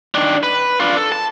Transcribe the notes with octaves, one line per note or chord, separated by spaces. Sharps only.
D#3 D4
B4
D4 F4
A4
A5